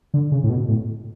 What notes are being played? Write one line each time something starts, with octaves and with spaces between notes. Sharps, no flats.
D3
C#3
A2
B2
A2